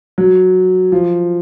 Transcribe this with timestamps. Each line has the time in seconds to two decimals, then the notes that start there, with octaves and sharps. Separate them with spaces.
0.18 F#3
0.92 F3